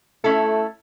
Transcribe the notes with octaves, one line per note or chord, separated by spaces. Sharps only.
A3 C#4 E4 A4